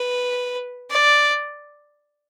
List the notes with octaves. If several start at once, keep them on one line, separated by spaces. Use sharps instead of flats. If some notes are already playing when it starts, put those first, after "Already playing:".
Already playing: B4
D5